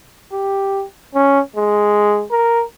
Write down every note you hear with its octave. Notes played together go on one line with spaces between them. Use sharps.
G4
C#4
G#3
A#4